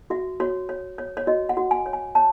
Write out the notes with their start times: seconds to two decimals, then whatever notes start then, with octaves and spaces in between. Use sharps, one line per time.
0.10 F#4 E5
0.40 F#4 C#5
0.69 C#5
0.98 C#5
1.17 C#5
1.27 F#4 D#5
1.49 F#5
1.57 F#4
1.71 G#5
1.86 C#5
1.93 G#5
2.15 C#5 A5